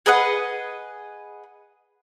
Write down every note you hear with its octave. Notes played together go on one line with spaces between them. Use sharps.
G#4 B4 D#5 F#5